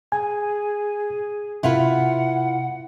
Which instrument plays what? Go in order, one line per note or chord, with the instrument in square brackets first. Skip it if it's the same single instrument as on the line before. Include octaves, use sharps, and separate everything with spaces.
[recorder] G#4 [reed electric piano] G#5
[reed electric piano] C3 [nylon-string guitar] E4 F4 B4 [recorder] F#5